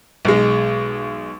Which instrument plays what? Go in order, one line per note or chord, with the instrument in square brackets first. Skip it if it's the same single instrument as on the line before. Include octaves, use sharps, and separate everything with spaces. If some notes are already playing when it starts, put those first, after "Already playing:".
[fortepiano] B1 G#3